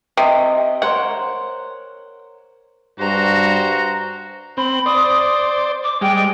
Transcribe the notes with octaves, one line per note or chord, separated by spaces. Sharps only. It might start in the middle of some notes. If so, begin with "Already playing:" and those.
C3 D#5
A#4 C5 C#5 F#5
G2 F#4 C5 A#5
C4 B5
C5 D5 D#6
D6
G3 G#3 G5